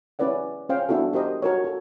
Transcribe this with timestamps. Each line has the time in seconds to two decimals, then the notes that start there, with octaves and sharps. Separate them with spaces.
0.19 C#4 E4 B4 D5 F#5
0.69 C#4 C5 F5 G5
0.89 B3 D4 E4 F#4 A4
1.13 G4 A#4 C5 D#5
1.42 F#4 A#4 C#5
1.64 F#4 A4